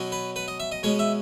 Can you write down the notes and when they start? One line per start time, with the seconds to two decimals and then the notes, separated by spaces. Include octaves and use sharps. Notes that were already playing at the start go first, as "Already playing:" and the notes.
Already playing: B2 F#3 C#4
0.12 B4
0.36 B4
0.48 D#5
0.60 E5
0.72 D#5
0.83 B2 G#3 C#4 C#5
0.99 E5